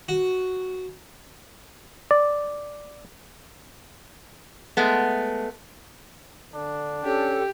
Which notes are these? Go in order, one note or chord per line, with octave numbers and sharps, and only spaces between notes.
F#4
D5
G#3 A3 B3
D3 D4
C#4 G4 A4